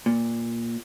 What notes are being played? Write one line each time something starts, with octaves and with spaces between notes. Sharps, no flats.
A#2